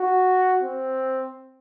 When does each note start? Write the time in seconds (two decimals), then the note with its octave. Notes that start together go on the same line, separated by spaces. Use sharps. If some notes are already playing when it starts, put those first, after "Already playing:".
Already playing: F#4
0.62 C4